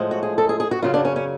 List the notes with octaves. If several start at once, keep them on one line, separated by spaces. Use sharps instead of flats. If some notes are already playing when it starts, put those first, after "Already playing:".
Already playing: A2 F3 G#3
F#4
G#4
A4
G#4
G#4
F#4
F#2 C#3 F#3 F4
D4
C#4
C#4